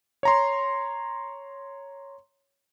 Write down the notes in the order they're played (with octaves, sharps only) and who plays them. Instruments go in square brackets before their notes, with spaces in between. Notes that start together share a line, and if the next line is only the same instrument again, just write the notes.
[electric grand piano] C#5 A#5 C6